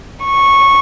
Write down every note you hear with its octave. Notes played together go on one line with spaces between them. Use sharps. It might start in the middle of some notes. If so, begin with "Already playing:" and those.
C#6